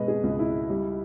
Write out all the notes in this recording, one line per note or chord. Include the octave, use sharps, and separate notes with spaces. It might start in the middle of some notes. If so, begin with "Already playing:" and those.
Already playing: B2 G#3 B4 D#5
G#4
C#2
E4
G3